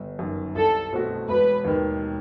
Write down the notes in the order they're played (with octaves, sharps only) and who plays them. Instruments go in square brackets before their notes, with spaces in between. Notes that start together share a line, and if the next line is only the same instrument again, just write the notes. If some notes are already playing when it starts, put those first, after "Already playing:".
Already playing: [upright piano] G1
F#2 D#3
[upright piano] C2 [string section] A4
[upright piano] B2 A3 C4 F#4
[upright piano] E1 [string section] B4
[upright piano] D#2 D#3